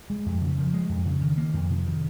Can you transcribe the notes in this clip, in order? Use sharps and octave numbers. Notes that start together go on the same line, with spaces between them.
G#3
F2
C#3
F3
G#3
F2
C#3
D#3
A#3
F2
C3
D#3